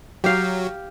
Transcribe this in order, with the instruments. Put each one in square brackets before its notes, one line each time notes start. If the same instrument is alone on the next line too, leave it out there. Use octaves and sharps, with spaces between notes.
[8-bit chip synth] F#3 [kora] G4 F5